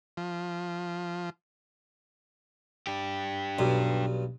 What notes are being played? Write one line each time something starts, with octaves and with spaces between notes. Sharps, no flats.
F3
D4 G4
B1 G2